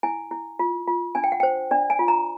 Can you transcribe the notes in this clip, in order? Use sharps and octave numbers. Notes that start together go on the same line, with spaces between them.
E4 G#5
E4
F4
F4
D4 G#5
G5
F#5
C5 G5
D4 D5
G#5
F4
A#5